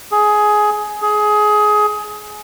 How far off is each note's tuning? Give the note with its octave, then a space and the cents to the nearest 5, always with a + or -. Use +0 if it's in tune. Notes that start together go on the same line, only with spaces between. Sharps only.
G#4 +15
G#4 +20